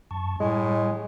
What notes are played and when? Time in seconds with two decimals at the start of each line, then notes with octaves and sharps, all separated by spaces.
0.11 F#2 A5 C#6
0.40 A2 G3 G#3 G#5